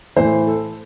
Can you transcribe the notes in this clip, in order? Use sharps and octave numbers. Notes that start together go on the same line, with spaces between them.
A2 E3 C5
A4